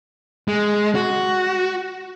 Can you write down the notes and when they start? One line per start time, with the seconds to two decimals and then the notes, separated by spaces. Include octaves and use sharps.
0.48 G#3
0.95 F#4